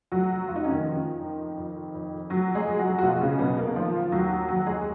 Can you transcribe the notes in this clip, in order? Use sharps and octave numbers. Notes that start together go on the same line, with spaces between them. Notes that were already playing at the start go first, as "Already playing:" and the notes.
F2 F#3 F#4
F1 F4
D#4
C#4
D#3 D#4
F3
F2
F2
F2
F2 F#3 F#4
G#3 G#4
F2
F#3 F#4
F#4
B2 F3 F4
C#3 C#4
B1 B2 B3
A#3
D#3 F3 F4
D#2 F#3 F#4
F2 F#3 F#4
G#3 G#4